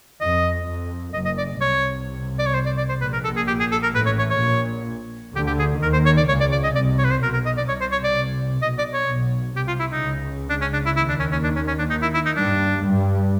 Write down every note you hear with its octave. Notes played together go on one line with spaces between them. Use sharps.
F2 D#5
F2
F#1 F#2 D#5
D#5
D5
C2 C3 C#5
D5
C#5
C5
D5
D5
C5
A#1 A#2 B4
A#4
A4
G#4
G4
G#4
A4
A#4
A1 A2 B4
C#5
C#5
C#5
A#1 A#2
D2 D3 G4
G4
G#4
D#2 D#3 A#4
C5
C#5
D5
C#2 C#3 C#5
D5
D5
D#5
C2 C3 D5
C#5
B4
C5
B1 B2 A#4
A#4
D#5
D5
C2 C3 C#5
C5
C#5
D5
B1 B2 D#5
D5
C#5
B1 B2
C2 C3 G4
F4
E4
D#4
C#2 C#3
D4
C#4
D4
E4
D#2 D#3 E4
D4
C#4
C#4
D4
C#4
C#4
D4
D#4
E4
E4
D#4
G2 G3 D4
G2 G3